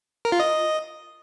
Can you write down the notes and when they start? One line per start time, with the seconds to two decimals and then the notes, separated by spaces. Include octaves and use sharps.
0.25 A#4
0.32 F4
0.40 D#5